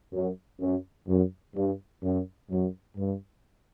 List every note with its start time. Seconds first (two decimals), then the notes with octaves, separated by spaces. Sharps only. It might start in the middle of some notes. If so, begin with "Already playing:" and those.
0.13 F#2
0.60 F#2
1.07 F#2
1.55 G2
2.03 F#2
2.50 F#2
2.97 G2